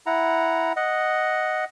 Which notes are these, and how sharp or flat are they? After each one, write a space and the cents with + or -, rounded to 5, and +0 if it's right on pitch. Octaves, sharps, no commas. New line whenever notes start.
E4 +0 F#5 +0 A#5 +0
D#5 +0 F#5 +0